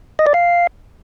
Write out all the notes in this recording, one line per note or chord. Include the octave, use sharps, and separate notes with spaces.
D#5
D5
F5